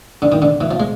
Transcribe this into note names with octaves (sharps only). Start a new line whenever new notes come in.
D3
D#3
D3
E3
F3
G#3